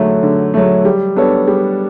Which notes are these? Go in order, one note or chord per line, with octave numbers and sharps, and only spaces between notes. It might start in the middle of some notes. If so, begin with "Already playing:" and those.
Already playing: D3 F#3 A3
D3
F#3 A3
G3
B3 D4 A4 C#5
G3